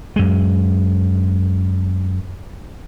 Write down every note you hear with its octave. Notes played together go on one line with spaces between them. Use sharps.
F#2 G#3